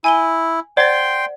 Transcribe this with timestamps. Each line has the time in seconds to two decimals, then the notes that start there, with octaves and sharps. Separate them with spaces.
0.04 E4 G#5 D#7 G7
0.77 C5 D5 F#5 G5 C6 A6